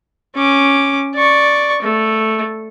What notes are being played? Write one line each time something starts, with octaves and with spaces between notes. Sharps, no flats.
C#4 D6
D5 C#6
A3